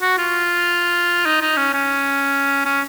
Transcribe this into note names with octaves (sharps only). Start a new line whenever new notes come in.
F#4
F4
D#4
D#4
C#4
C#4
C#4